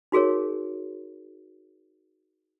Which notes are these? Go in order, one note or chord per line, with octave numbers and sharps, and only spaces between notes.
D#4 F#4 G#4 A#4 C#5